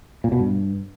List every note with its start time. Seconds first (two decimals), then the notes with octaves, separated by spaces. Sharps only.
0.24 A#2
0.32 B2
0.40 G2